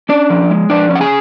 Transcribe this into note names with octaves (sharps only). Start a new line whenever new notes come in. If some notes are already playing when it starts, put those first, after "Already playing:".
C#4 D4 D5
F3
G#3
F3 D4 D5
C#4
F#5
G#4 G#5